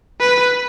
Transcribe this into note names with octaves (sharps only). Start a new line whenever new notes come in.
B4